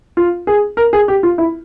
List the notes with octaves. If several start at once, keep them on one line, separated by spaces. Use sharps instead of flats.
F4
G#4
A#4
G#4
G4
F4
E4